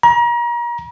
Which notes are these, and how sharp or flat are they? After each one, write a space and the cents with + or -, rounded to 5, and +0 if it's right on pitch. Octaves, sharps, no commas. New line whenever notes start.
A#5 +35